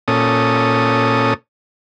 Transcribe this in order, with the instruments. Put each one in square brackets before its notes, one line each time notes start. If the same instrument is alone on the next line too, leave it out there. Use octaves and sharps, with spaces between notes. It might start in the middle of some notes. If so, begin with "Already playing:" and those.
[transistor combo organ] A#2 C#4 A4 D#6